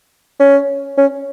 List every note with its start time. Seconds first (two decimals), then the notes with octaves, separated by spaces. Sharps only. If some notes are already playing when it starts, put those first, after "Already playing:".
0.40 C#4
0.97 C#4